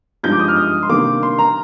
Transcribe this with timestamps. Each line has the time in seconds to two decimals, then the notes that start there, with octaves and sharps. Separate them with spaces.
0.23 G2 F3 G#3 D#4 G6
0.32 D6
0.39 D#6
0.48 F6
0.57 D#6
0.83 C6
0.89 C3 D#3 G3 A#3 D4 D6
1.23 C6
1.38 A#5